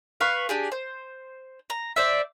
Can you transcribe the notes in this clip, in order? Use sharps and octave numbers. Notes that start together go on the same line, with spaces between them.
B4 F5 C#6
D4 G4 G#4
C5
A#5
C5 D5 E5